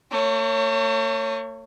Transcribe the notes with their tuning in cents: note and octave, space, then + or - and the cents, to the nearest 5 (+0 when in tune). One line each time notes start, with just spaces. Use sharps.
A3 +45 C#5 -5